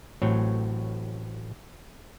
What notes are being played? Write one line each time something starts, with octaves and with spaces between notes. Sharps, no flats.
A1 A2 F#3 C4 C#5